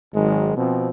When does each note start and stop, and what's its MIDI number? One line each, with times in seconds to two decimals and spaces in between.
0.15 0.55 32
0.15 0.55 51
0.15 0.55 54
0.15 0.55 56
0.57 0.89 47
0.57 0.89 53
0.57 0.89 60